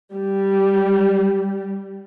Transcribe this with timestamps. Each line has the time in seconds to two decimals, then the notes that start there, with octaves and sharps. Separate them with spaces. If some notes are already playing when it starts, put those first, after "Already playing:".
0.14 G3